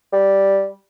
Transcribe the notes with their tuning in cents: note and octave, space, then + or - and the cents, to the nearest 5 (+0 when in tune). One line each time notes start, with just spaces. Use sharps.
G3 -5